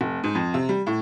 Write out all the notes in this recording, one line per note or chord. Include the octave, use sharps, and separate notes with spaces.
F1
G#2
F2
C3
G3
A2